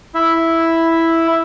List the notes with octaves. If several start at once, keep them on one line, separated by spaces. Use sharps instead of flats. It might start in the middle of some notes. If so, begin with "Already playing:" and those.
E4 E5